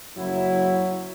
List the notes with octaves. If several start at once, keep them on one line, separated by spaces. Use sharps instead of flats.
F#1 F#2 F#3 E4